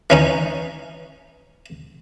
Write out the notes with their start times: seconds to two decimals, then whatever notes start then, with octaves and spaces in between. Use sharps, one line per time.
0.10 E3 C#4 D#4